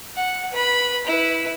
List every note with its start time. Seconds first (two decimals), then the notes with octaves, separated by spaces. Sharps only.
0.16 F#5
0.53 B4 B5
1.06 E4 B4